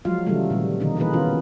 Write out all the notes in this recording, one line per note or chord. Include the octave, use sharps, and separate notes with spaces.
F3 F#3 G#3 F4 F5
C#3 E3 F#3 G3 A3
A#2 D#3 G3
B2 D3 D#3 D#4
E3 A#3 B3 D#4 G#4 B4
D#3 B3 C#4 F4